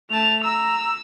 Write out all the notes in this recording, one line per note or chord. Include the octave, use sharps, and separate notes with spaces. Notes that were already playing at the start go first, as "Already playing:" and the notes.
A3 A5 F7
A#5 E6